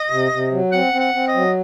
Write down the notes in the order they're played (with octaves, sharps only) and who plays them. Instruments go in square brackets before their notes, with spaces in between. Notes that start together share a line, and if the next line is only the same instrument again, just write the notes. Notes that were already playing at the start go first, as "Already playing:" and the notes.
Already playing: [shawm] D#5
[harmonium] C3
C3
F#3
[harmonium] C4 [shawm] F#5
[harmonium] C4
[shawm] F#5
[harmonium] C4
[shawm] D#5
[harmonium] F#3